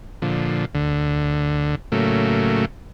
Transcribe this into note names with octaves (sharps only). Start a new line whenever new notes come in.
A#2 D3 F3
D2 D3
A2 C#3 F#3 A3 A#3